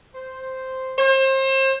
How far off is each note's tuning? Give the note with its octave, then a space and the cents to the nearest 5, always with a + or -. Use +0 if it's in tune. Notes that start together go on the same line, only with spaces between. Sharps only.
C5 -5
C5 +35